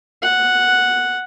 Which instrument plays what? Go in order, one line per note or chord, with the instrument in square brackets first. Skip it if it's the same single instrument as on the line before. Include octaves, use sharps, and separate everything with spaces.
[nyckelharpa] F#5